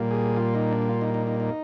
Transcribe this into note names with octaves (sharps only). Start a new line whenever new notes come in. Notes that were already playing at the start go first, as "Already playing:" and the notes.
Already playing: A#2 G3 A#3
G#4
F4
D#4
D4
F4
D#4
D#4
D#4
D#4